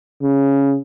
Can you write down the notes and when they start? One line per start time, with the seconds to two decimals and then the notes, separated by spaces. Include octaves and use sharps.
0.22 C#3